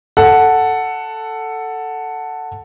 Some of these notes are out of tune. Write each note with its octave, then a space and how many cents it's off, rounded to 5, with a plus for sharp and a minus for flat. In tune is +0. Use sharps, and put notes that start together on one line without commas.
A4 +5 F#5 +0